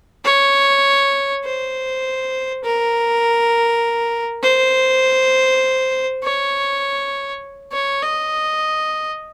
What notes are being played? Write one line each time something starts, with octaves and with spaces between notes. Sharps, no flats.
C#5
C5
A#4
C5
C#5
C#5
D#5